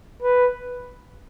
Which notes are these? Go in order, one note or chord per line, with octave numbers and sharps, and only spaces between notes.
B4